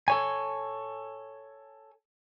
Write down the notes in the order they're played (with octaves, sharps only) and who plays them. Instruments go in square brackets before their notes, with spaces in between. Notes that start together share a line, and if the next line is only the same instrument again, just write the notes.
[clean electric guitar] A4 C#5 G#5